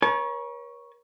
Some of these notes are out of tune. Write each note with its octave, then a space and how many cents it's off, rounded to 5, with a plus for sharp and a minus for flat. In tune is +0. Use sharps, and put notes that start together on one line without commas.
A#4 +45 C#5 +0 A5 -45